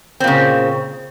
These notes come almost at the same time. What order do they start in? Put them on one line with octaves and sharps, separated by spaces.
C4 A#2 C#3